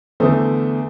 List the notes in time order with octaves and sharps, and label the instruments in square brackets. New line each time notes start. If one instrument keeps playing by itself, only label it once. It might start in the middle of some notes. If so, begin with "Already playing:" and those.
[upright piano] E2 D3 A3 C5 D#6